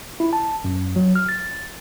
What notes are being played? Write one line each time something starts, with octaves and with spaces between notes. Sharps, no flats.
E4
A5
F#2
F#3
F6
A6